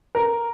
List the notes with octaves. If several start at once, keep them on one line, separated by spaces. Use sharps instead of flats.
A#4